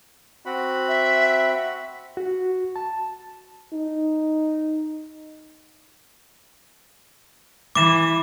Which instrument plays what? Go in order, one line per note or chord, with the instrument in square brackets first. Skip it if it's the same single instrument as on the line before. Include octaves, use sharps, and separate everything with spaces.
[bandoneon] C4 F#4 B5
[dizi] E5
[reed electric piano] F#4
A5
[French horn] D#4
[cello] E3 [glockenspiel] D6 E7